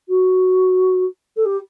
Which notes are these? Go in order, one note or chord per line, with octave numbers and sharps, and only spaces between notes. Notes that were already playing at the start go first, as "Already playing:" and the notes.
F#4
A4
G4